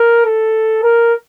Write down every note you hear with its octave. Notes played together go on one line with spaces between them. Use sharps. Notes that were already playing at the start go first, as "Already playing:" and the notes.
Already playing: A#4
A4
A#4